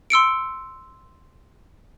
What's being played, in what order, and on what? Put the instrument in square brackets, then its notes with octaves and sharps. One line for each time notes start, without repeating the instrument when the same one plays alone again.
[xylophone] C6 E6 C#7 D7